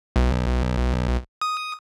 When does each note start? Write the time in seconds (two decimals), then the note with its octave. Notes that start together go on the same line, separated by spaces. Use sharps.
0.16 B1
1.41 D#6